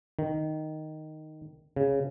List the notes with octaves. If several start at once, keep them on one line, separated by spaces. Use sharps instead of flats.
D#3
C#3